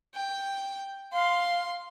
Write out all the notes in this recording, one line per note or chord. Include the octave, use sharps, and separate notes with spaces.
G5
F5 C6